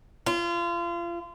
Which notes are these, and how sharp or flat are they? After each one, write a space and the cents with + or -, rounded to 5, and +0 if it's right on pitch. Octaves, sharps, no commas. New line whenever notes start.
F4 -30